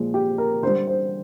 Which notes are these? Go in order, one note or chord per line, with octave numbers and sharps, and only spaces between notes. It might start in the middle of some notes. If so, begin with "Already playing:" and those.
Already playing: A#2 F3 G#3
G4
A#4
D3 G3 C5
C5